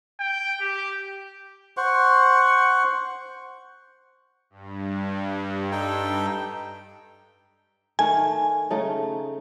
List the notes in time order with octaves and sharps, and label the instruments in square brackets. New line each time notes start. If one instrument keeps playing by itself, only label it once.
[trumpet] G5
G4
[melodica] C5 F#5 C#6
[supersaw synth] G2
[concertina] D#4 A4 G5
[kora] D#3 A3 [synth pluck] G#5
[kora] C#3 A3 D#4